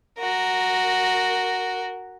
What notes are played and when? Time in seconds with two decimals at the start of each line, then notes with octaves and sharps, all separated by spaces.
0.18 F#4 A#4